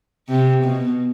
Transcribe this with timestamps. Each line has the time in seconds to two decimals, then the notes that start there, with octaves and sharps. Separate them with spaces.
0.28 C3
0.64 B2